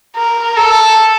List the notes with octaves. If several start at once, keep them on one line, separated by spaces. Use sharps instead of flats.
A#4
A4